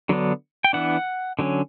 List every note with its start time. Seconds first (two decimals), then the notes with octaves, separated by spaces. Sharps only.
0.09 D3 F#3 B3 D4
0.64 G5
0.73 E3 B3 D4 F#5
1.39 D3 F#3 C#4